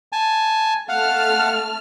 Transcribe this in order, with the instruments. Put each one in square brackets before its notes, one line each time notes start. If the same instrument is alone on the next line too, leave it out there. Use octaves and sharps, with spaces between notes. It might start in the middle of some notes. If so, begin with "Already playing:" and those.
[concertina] G#5 A5
[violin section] A3 A5 F6 [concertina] F5 F#5